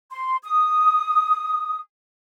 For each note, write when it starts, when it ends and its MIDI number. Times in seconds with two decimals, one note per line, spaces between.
0.11 0.37 84
0.43 1.78 87